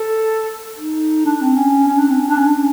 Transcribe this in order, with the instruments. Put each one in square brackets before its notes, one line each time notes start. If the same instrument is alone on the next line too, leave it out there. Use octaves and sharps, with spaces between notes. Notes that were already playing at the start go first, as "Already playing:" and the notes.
Already playing: [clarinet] A4
D#4
D4
C4
C#4
C#4
D4
C4
C#4
D4
C#4
D4
C#4